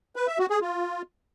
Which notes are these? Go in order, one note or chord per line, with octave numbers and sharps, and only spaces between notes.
B4
E5
F#4
G#4
F4